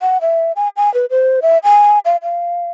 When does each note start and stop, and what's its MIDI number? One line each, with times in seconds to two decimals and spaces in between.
0.02 0.18 78
0.21 0.52 76
0.56 0.69 80
0.77 0.92 80
0.94 1.06 71
1.10 1.40 72
1.42 1.58 76
1.64 1.99 80
2.05 2.17 77
2.23 2.71 77